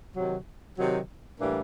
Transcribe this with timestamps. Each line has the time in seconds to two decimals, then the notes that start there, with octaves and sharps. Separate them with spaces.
0.15 C3 D#3 F#3
0.78 C3 D#3 F#3
1.40 A2 E3 G3 A#3 D4